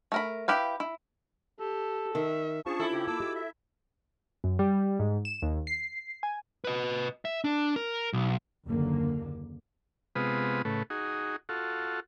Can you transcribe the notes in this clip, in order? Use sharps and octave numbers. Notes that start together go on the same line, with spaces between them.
A3 A#4 B5
E4 G4 B4 F5
E4
G4 A4
D#3 E5
C#4 D4 F4 G#4 C5 A5 C#6
E4 A4
C#3 G4
A#3 A5 D6 E6
F#4 G4 D#5
E5
F#2
G3
G#2
E7
D#2
C7
G#5
B4 D#5
E5
D4
A#4
B1
F#1 D#2 D3 A#3
C3 G#3 B3 F4 B4 D#6
A2 C#3 A3 B4
D#4 F#4 G#4
F4 F#4 A4